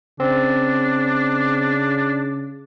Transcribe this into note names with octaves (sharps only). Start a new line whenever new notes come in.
C#3 C4 D4